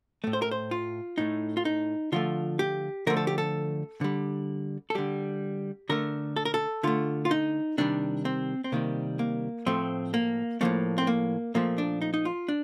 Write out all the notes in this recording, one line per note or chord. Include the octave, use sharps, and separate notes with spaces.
A2 A3
C5
A#4
C5
F4
A2 A3 D#4
F4
D#4
D3 F3 A3 F4
G4
D3 F3 A3 A#4
A4
G4
A4
D3 G3
A4
D3 G3 G4
D3 A3 A#4
A4
A#4
A4
D3 A3 F4
F4
D#4
C3 D#3 G3 D4
C4
C4
C3 D#3 G3 A#3
A#3
A2 F3 A3 C4
A#3
A2 F3 A3 A#3
C4
A#3
A#2 F3 A3 A#3
D4
D#4
D#4
F4
D4